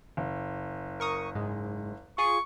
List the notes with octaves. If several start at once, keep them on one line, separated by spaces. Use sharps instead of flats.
F#1
A#4 C#6 D#6
G#2 G#3
F4 G#4 C#6